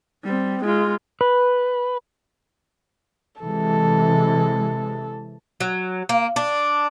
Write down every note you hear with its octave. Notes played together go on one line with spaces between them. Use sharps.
G3 C4
G#3 F4
B4
C3 E3 G#3 A4
F#3
A#3
D4